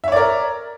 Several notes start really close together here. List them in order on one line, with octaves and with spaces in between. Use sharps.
E5 C#5 D5 A#4